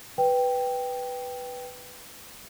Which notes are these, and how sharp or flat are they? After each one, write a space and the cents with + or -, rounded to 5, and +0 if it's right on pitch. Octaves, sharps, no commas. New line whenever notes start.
B4 +0 G5 +0